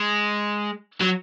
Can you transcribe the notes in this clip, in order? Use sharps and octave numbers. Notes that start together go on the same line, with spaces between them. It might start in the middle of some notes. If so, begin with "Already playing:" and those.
Already playing: G#3
F#3